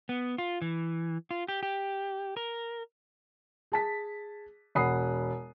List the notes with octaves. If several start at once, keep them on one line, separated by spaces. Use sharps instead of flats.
B3
F4
E3
F4
G4
G4
A#4
G#4 A5 B6
E1 F#5 B5 D#6 C7